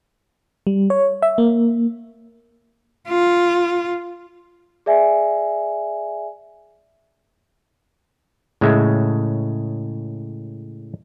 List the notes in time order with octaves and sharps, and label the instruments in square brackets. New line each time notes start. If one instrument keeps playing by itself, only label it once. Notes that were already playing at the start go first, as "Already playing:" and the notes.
[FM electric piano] G3
C#5
E5
A#3
[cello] F4
[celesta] G#4 D5 E5 G#5
[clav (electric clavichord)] A2 C#3 G#3 E5